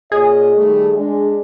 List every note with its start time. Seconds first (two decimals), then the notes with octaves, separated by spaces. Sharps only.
0.12 A#2 G#4 C#5 D#5
0.58 D#3 G3 A3
0.95 G#3 D4